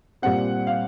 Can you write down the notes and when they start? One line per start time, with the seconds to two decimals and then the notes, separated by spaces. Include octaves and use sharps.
0.22 A#2 G3 C4 F#5
0.67 F5